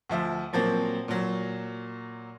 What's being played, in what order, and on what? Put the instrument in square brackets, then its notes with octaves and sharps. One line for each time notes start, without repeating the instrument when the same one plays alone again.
[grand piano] D2 F3 E5
A#2 F3 F#3 A#3 C4
A#2 F#3